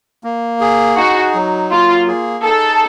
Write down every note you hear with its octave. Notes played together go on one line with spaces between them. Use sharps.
A#3
G#4
D#4 F#4
F#3
A#3 F4
G#4
D#4 A4